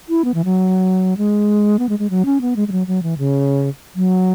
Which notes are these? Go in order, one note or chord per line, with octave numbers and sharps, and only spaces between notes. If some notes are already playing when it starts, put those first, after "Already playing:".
E4
B3
E3
F#3
G#3
B3
G#3
G#3
F#3
C#4
B3
G#3
G#3
F#3
F#3
E3
C#3
F#3